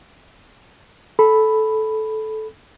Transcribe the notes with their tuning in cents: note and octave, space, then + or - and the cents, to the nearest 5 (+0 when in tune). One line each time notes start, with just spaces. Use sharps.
A4 -15 B5 +0